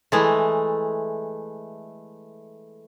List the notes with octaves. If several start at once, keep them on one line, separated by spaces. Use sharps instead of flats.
E3 G#3 A3